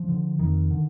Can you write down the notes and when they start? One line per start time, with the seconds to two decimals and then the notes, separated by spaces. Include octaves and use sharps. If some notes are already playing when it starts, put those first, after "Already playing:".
Already playing: F3
0.09 D3
0.39 F2 D#3
0.71 D3